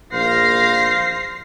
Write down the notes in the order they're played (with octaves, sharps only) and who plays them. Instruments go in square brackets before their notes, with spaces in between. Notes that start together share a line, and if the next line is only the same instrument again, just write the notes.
[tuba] A#1 [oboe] C5 [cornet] F5 [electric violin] A#6 C7